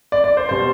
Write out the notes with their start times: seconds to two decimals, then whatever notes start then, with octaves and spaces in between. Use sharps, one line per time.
0.12 D5
0.24 D5
0.37 C5
0.49 B2 G3 C5